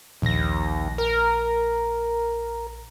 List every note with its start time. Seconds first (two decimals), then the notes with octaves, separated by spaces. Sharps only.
0.22 A#1 D#2 A#6
0.98 A#4